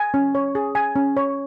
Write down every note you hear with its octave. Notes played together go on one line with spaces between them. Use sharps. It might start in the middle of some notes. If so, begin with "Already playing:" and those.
Already playing: G#5
C#4
C#5
G#4
G#5
C#4
C#5